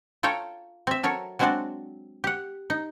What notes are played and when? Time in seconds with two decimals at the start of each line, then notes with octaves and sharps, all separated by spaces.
0.23 F4 A4 C#5 G5 A#5
0.87 C4 E5
1.03 F#3 A4 A#4 C#5
1.39 F#3 G#3 C4 D4 F#4 D5
2.24 G4 F#5
2.70 D#4